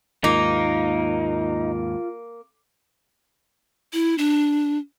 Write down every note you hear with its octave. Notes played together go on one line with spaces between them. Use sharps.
D#2 G#2 A#3 D#4 F4
E4
D4